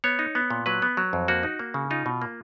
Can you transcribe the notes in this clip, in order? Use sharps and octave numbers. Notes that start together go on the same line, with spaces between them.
B3 C#5
D#4
B3
A#2
F#3 B4
B3
F#3
F2
A#3 F#4
D#4
A#3
C#3
D#4 F4
B2
A#3